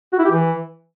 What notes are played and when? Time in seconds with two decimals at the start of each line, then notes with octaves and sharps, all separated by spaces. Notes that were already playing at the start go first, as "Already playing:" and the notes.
0.13 F#4
0.19 E4
0.25 G4
0.31 E3